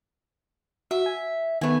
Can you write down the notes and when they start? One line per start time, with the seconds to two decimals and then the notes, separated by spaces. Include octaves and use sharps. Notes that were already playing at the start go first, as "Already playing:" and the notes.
0.91 F#4 E5
1.06 G#5
1.61 D#3 A3 B3 B4 G#5